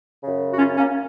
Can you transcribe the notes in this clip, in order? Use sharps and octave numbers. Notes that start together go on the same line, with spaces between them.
F#2 C#3
F#4
C#4 F4
A#3 C#4